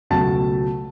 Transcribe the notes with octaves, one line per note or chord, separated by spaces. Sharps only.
C#2 B2 F#3 A3 A5